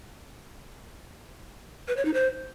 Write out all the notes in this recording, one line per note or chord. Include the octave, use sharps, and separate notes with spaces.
B4
C#5
D#4
C5